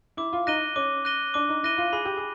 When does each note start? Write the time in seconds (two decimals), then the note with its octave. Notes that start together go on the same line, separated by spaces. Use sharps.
0.17 E4 D6
0.33 F4
0.47 D#4 F#6 A#6 D#7 G7
0.76 C#4 D6
1.05 F#6 A#6 D#7 G7
1.34 D4 D6
1.49 D#4
1.63 E4 F#6 A#6 D#7 G7
1.78 F4
1.93 G#4 B5
2.05 G4
2.17 G#4